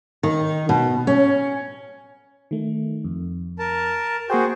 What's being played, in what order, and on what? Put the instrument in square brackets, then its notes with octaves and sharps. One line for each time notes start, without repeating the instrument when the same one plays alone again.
[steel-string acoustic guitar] D#3
B2
C#4
[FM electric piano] D#3 A3
F2
[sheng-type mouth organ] A#4 A5
[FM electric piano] A#3 G5 [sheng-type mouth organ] F#4 G#4 C5